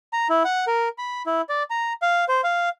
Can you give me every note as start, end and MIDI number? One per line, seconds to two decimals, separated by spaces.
0.13 0.28 82
0.30 0.43 64
0.45 0.65 78
0.67 0.88 70
0.98 1.23 83
1.26 1.41 64
1.49 1.63 74
1.70 1.93 82
2.02 2.24 77
2.29 2.41 72
2.44 2.69 77